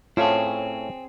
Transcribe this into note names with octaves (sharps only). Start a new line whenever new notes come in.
A2 C4 C#4 F4 G#4 C#5 G#5 A5